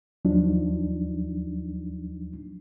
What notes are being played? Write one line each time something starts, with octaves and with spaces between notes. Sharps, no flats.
D#2 F3 F#3 D4 D#4